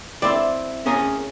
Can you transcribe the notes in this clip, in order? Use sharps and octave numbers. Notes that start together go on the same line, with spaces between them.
C4 E4 D5 C6
C#4 G#4 A#4